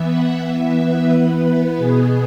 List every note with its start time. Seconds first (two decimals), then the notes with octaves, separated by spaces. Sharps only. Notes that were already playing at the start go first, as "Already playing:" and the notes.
Already playing: E3 B3 E5
0.08 F#5
0.42 E3 B3 E5
0.76 B4
1.10 E3 B3
1.43 B4
1.77 B2 B3 G#4